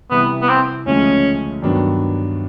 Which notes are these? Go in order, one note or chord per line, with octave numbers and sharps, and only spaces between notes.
C3 E3 G3 B3
B3
C4
D2 C#3 F3 G#3 C#4
G2 D#3 F#3 B3 D4